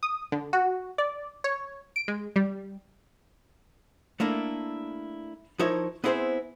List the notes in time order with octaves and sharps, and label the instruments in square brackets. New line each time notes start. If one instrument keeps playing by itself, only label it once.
[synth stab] D#6
D3
F#4
D5
C#5
D7
G#3
G3
[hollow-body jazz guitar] A3 A#3 D4 E4
F3 D#4 E4 A#4 C#5
B3 C4 E4 G#4 A4 C5